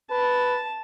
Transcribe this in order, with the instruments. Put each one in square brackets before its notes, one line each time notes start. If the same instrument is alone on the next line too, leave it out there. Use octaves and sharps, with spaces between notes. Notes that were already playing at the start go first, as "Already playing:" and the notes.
[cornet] B4 [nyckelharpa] A5